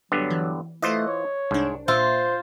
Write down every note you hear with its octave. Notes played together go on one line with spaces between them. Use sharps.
G2 D3 F#3 B3
E3
E3 A3 F4 C5 D#5
C#5
C2 G#2 D4
A#2 F4 C5 E5